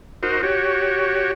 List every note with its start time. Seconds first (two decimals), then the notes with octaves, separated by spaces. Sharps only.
0.23 D#4 F#4 A#4 C5
0.43 F#4 G4 C#5